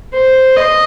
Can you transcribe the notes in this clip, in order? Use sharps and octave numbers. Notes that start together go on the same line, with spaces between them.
C5
D#5